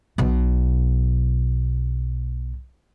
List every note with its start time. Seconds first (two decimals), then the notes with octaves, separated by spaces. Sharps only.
0.18 B1 B2